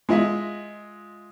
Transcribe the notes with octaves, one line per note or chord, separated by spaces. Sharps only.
G#3 F4 D#5 E5